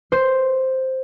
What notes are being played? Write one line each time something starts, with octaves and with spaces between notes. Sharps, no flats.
C5